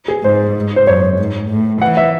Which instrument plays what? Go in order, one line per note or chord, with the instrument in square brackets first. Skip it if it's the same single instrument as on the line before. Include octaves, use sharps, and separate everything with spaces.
[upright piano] G#4
[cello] G#2 [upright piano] C5
[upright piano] C5
[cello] F#2 [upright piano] C#5
[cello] G#2
A2
[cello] E3 [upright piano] F#5
[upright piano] E5